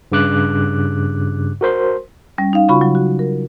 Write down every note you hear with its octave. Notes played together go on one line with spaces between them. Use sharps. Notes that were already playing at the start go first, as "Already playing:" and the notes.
G2 C#3 D6 F#6
F#4 A#4 C5 C6
G3 C#4
D#4 F5
C#3 F4 F#4 B5 C#6
F#3
F#4
A#4